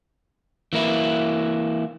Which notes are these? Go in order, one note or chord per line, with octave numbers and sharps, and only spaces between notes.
E3 A#3 E4